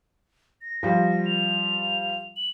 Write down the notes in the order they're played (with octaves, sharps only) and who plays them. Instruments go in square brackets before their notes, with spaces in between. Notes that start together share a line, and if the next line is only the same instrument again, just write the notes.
[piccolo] A#6
[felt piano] F3 G3
[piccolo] F7
F#7